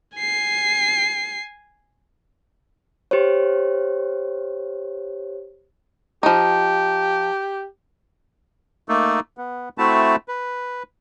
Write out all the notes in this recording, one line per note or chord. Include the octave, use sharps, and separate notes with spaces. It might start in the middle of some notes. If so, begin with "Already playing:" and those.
G#5 C7
G4 C5 C#5
F3 D#4 G4
A3 A#3 D#4 A4
B3
A3 C4 E4 F#4 E5 A5
B4